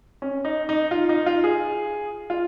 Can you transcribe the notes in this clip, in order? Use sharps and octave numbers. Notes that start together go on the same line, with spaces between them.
C#4
D#4
D#4
F4
D#4
F4
G#4
F4